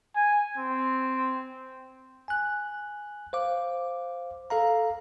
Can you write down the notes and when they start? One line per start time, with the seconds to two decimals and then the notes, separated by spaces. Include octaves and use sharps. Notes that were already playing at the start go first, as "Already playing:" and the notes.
0.15 G#5
0.57 C4
2.28 G#5 F#6
3.33 C5 F5 D6
4.50 A4 F5 A#5